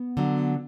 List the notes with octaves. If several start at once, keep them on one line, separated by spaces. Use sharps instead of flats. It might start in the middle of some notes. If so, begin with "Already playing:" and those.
Already playing: B3
D3 F#3